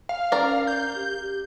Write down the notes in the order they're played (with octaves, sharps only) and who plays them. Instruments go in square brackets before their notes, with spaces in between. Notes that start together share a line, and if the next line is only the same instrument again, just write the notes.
[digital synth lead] F5
[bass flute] C#4 [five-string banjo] A#4 D5
[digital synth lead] G6
[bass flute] G4
G4